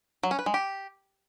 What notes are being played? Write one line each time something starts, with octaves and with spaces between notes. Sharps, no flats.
F#3
C#4
B4
G#3
G4